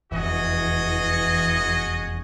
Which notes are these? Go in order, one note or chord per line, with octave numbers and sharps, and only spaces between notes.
F1 E2 E3 F#4 G#4 D#5